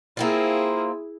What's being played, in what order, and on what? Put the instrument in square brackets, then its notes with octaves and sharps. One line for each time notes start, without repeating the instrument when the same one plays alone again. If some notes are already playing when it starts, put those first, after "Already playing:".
[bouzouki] A#3 C4 F4 [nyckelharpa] E4 G#4